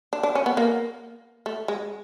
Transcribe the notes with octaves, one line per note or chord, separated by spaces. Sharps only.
D4
D4
C#4
B3
A#3
A3
G#3